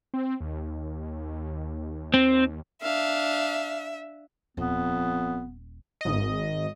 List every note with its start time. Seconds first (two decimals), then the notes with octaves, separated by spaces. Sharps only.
0.14 C4
0.41 D#2
2.14 C4
2.82 D4 E5 F5
4.57 D#1 F2 B3
6.01 G#1 D#5